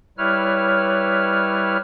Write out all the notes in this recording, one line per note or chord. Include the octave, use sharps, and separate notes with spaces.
G3 E4 B4 C#5 F6